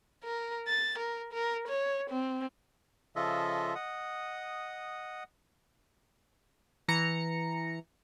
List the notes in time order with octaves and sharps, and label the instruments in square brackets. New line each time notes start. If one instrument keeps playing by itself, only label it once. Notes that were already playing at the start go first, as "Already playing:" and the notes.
[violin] A#4
A6
A#4
A#4
C#5
C4
[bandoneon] C#3 F3 F4 A4 D#5 E5
D#5 F#5 D#6
[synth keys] E3 A#5 C#7